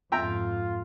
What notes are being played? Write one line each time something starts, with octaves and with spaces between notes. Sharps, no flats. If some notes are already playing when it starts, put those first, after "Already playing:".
F2 G#2 F4 E5 G5 A#5